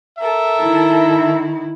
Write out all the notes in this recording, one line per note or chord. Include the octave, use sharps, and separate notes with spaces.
A4 A#4 E5
D#3 E4